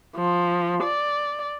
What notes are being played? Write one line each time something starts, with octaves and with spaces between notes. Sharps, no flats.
F3
D5